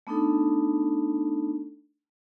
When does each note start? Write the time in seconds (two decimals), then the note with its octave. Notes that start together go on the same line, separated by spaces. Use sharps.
0.07 A3 B3 D4 D#4 A4